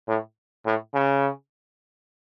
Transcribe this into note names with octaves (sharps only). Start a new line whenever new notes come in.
A2
A2
C#3